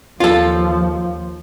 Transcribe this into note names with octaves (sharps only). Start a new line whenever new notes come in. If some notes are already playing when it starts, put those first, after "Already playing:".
D#2 F3 F4 A4